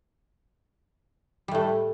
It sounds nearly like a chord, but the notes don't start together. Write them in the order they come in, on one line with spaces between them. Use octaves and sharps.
G3 A2 A3